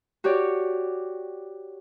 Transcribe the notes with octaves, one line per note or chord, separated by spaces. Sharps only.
F#4 G4 C#5 D5